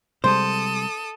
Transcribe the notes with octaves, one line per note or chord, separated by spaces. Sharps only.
C3 G3 G#3 A4 C5 D#6